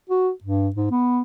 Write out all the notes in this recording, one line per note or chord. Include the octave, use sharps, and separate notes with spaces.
F#4
G2
G#2
B3